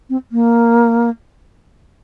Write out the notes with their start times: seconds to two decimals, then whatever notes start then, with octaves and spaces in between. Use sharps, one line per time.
0.10 C4
0.32 A#3